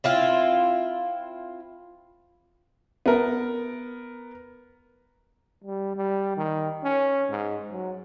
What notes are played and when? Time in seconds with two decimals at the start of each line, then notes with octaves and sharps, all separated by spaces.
0.04 C4 E4 F4
3.06 B3 A#4
5.64 G3
5.96 G3
6.37 D#3
6.83 C#4
7.30 G#2
7.72 F#3